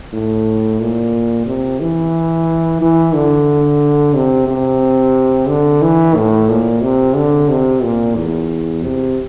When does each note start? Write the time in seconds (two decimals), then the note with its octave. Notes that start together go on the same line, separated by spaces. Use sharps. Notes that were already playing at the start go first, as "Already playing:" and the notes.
0.13 A2
0.80 A#2
1.47 C3
1.80 E3
2.81 E3
3.14 D3
4.14 C3
4.48 C3
5.48 D3
5.82 E3
6.15 A2
6.49 A#2
6.82 C3
7.16 D3
7.49 C3
7.83 A#2
8.16 E2
8.83 C3